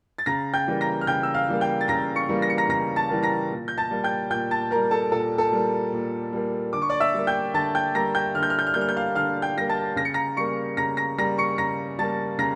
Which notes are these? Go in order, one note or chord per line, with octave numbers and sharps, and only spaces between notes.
A6
C#3 A#5 A#6
G5 G6
E3 G3 A#3
A#5 A#6
F6
C#3 G5 G6
E6
F5 F6
E3 G3 A#3
G5 G6
A6
C#3 A#5 A#6
C#6 C#7
E3 G3 A#3
A#6
C#7
A#5 A#6
C#3 A#5 A#6
A5 A6
E3 G3 A#3
A#5 A#6
A#2
G6
A5 A6
G3 A#3
G5 G6
A#2 G5 G6
A5 A6
G3 A#3 A#4 A#5
A4 A5
A#2 A4 A5
A4 A5
G3 A#3
A#2
G3 A#3
D3 D6
C#6
D5 D6
E5 E6
G3 A#3
G5 G6
D3 A5 A6
G5 G6
G3 A#3 A#5 A#6
G5 G6
D3 F6
G6
F6
G6
F6
G3 A#3 G6
F6
G6
F5 F6
D3 F5 F6
G5 G6
G3 A#3 A#6
A5 A6
C#3 A#6
C#7
A#5 A#6
G3 A#3 C#6 C#7
C#3 A#5 A#6
A#5 A#6
G3 A#3 A#5 A#6
C#6 C#7
C#3 A#5 A#6
G3 A#3 A5 A6
C#3 A#5 A#6